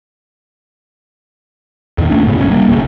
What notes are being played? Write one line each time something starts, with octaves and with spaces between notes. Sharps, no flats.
E2 A#2 D#3
F#1 A3 C#4 D4
D2 G#2 C#3 B3
G1 C2 C3 C#4
G3 A#3
F#1 B1 F#2 C#3